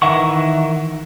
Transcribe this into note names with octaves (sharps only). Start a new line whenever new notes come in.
D#3 E3 E5 F#5 C#6